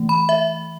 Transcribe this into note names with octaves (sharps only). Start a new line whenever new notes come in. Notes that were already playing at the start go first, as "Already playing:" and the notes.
Already playing: E3 A3
B5
E5